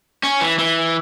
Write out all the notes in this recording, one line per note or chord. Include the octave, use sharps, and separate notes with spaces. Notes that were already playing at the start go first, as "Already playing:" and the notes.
C#4
E3
E3